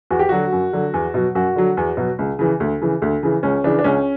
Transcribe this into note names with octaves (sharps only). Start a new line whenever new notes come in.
E2 F#4
G4
D3 F#3 F#4
F#2
D3 F#3
E2
B2 F#3
F#2 F#4
D3 F#3
E2
B2 F#3
C#2
C#3 E3
D2
C#3 E3
D2
C#3 E3
C#2 C#4
C#3 E3 D4
D4
C#2 C#4